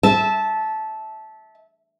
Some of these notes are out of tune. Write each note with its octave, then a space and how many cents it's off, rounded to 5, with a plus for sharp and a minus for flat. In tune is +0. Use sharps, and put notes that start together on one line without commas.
E5 -20 A5 -10